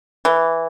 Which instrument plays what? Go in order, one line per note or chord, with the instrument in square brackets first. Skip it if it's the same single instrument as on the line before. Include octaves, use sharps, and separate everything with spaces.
[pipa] E3